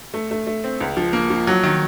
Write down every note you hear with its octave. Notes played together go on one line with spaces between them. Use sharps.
A3
A3
A3
C4
C#2
F3
A#3
F3
F#3
D#3